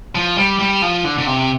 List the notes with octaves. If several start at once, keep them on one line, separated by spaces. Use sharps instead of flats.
F3
G3
G3
F3
D3
D3
C3